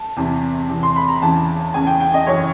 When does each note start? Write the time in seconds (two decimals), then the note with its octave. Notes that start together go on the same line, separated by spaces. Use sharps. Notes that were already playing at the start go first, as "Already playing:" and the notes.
Already playing: A5
0.16 E2 C3 E3
0.69 E2 C3 E3
0.83 C6
0.96 B5
1.08 A#5
1.22 E2 C#3 E3 A5
1.74 E2 C#3 E3 G#5
1.87 G5
2.00 G5
2.14 D#5
2.27 F#2 C#3 E3 C#5